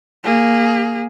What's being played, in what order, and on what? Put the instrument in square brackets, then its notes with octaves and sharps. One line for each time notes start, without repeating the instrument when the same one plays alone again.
[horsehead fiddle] A#3 G#4